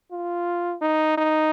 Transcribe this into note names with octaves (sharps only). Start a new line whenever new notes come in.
F4
D#4
D#4